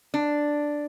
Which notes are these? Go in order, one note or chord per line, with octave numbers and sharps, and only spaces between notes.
D4